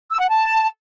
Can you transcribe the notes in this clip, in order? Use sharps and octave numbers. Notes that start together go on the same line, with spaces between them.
E6
F#5
A5